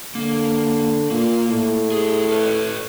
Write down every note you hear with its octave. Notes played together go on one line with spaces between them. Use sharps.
D3 A#3
A#2 A#3
A2
A3 G#4
A4 B4 C#5